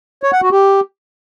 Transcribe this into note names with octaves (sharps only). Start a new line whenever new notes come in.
C#5
F#5
F#4
G4